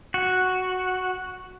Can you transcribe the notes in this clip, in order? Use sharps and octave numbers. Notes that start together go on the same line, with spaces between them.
F#4